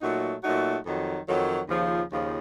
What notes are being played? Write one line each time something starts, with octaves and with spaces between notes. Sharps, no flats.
A#2 F#3 A3 D#4 F#4
A#2 F#3 A3 D#4 F#4
F2 D#3 F#3
F2 D#3 F#3
D#2 C#3 F3
D#2 C#3 F3